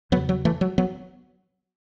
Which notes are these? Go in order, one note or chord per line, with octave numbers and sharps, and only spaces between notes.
E2 C#3 F#3 B3
F#3
E3 A3
F#3
F#3 B3